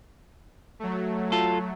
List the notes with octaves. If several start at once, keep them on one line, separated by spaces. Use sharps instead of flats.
F#3 A3
F4 A4